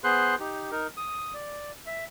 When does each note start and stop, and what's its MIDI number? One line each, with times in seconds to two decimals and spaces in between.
0.04 0.35 59
0.04 0.35 68
0.04 0.35 71
0.04 0.35 72
0.04 0.35 84
0.04 0.35 90
0.39 0.71 63
0.39 0.71 67
0.71 0.87 63
0.71 0.87 70
0.97 1.34 87
1.34 1.72 74
1.86 2.05 76